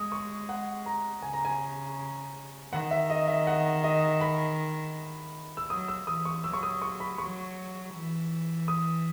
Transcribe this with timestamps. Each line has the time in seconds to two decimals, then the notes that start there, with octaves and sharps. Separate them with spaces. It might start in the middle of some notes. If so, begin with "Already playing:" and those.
Already playing: G#3 D#6
0.12 C#6
0.49 F#5
0.86 A#5
1.22 C#3 G#5
1.33 A#5
1.45 G#5
2.72 D#3 F#5
2.91 E5
3.10 D#5
3.28 E5
3.47 F#5
3.84 D#5
4.21 B5
5.57 E6
5.70 F#3 D#6
5.88 E6
6.07 E3 D#6
6.25 C#6
6.44 F#3 E6
6.53 C#6
6.63 D#6
6.82 C#6
7.00 B5
7.18 F#3 C#6
7.94 E3
8.68 D#6